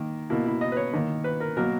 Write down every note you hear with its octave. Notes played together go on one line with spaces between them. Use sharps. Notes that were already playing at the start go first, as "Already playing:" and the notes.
Already playing: D#3 A#3
B2 A#3 E4
E4
D#5
B4
C#5
D#3 A#3
B4
A#4
B2 F#3 A#3 A#4